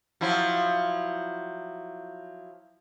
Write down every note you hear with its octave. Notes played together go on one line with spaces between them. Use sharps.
F3 F#3 E4